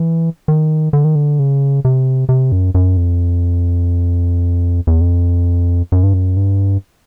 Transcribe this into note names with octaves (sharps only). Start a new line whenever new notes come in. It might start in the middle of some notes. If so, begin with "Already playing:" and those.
Already playing: E3
D#3
D3
D#3
D3
C#3
C3
C3
F#2
F#2
F2
E2
F2
F#2
G2
F#2
G2